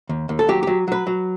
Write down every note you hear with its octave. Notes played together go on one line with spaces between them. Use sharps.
D#2
D#2
A4
F#3 G4
F#3 G4
F#3 B4
F#3